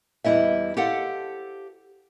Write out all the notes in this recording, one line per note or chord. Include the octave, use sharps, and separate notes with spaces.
E2 G3 E4 D#5 E5
G4 A4 C5 F5 F#5